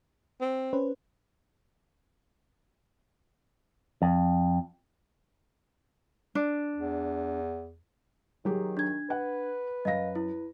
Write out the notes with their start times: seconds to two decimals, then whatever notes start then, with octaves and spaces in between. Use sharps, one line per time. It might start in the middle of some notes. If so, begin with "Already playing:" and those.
0.41 C4
0.73 C#4 B4 C5
4.02 F2
6.35 D4
6.75 E2
8.45 D#3 F#3 G4 G#4
8.77 D4 G#6
9.10 B4 F#5
9.85 F#2 D#5 F5 A#6
10.15 E4